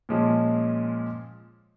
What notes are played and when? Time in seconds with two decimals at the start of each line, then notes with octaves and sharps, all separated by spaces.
0.09 A#2 F3 G#3 C#4